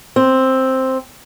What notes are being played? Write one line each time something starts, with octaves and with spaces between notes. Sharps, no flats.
C4